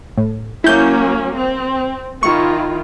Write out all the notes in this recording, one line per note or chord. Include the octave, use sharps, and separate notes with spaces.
A2
F#3 A#3 C#4 E4 G6
C4
D#3 E4 F4 C#6